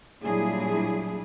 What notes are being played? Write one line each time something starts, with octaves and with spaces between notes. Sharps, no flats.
A#2 F#3 G3 D4 E4 G#4